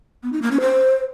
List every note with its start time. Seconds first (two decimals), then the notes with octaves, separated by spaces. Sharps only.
0.23 B3
0.32 D#4
0.42 A#3
0.51 C#4
0.61 C5